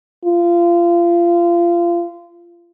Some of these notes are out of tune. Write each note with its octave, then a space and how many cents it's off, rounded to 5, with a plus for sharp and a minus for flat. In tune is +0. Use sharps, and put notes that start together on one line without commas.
F4 -25